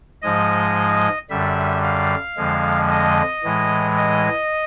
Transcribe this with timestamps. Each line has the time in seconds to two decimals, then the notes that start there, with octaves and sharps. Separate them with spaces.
0.22 G#2 F3 G#3 D#5
1.30 F#2 D3 G3 E5
1.83 F5
2.37 F2 D3 F3 G#3
2.91 D#5
3.44 A2 E3 G#3
3.97 D#5